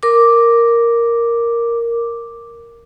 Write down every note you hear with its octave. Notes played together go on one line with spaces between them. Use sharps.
A#4 D6